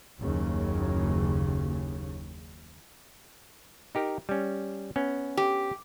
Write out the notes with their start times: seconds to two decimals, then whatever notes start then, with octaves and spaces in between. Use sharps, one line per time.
0.20 F#1 D#2 C#3
3.95 D#4 G4 A#4
4.29 G3 C#4
4.96 B3 C#4
5.37 G4